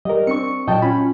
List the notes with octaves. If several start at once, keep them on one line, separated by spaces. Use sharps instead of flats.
G3 A#4 D#5
C4 D4 C#6 C#7
A#2 F#3 D#5 G5 A5
C#4 F4 B5